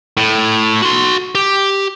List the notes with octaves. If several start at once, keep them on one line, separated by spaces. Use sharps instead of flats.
A2
F#4 C6
G4